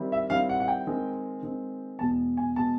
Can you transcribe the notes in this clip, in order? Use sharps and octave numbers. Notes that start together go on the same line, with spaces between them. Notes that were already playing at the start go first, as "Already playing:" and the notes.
Already playing: D#3 G3 C4 E4
E5
D#3 G3 C4 E4 F5
F#5
F#5
G5
D#3 G#3 C4
D#3 G#3 C4
E2 B2 G#3 B3 A5
G#5
B2 G#3 B3 A5